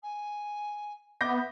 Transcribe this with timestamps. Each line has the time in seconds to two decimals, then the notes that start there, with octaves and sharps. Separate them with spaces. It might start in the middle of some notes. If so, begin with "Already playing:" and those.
0.03 G#5
1.21 B3 E5 D6 G6 A#6